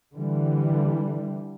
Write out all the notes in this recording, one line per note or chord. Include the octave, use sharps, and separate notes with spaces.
D3 E3 G3